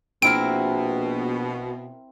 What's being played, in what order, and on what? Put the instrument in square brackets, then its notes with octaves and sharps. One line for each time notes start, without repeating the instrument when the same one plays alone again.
[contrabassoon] A#1 [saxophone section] B2 [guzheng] C4 E4 A#4 [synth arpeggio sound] D7